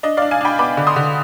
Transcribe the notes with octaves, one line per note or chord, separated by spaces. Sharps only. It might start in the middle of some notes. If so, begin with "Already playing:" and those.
D4 D#5
D4 D5 F5
F5 G#5
D4 G5 B5
B3 B5 D6
D3
C6 D#6
D3